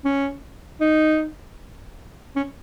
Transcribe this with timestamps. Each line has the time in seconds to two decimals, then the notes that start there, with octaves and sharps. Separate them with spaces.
0.05 C#4
0.81 D#4
2.36 C#4